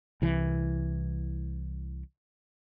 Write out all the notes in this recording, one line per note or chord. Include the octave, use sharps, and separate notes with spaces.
C2 E3